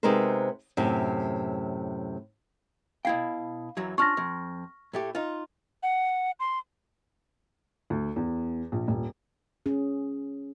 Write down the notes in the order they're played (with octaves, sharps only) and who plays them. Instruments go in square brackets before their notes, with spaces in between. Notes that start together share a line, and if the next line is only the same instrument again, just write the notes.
[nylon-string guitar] C3 G#3 B3 D#4 A#4 C5
F#2 A2 C3
[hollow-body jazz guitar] B2 E4 G5 [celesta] F5 C7
[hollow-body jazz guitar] F#2 E3 F#3
[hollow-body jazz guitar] C#4 D4 F4 [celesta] C#6 F6 A#6
[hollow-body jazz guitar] F2
A2 A3 G4
D#4 F4
[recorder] F#5
C6
[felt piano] D2
E2
A#1
D#1
[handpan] C#4 G#4